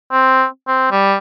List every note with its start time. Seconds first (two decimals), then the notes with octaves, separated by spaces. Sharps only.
0.12 C4
0.67 C4
0.91 G3